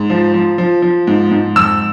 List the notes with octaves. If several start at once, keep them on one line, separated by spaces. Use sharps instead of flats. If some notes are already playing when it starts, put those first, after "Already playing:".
Already playing: G#2
F3
F3
F3
F3
G#2
G#2
F2 E6